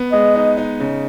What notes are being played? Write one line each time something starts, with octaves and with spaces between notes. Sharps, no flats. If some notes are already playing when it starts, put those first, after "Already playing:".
Already playing: B3
G#3 D#5
D#4
D#4
C#3